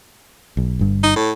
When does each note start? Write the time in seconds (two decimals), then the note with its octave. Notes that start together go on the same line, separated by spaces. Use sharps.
0.57 B1
0.79 G1 G2
1.03 D#4
1.16 A2